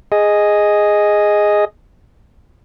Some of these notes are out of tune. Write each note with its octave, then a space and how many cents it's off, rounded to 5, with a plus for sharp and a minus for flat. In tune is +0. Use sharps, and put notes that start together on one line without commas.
G#4 +0 D#5 +0